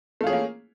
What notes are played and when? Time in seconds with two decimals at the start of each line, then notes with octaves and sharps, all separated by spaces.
0.21 A3
0.24 F4
0.27 G#4
0.30 C#4
0.33 A#3